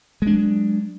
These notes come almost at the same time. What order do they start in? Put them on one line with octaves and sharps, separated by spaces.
G#3 D4 F#3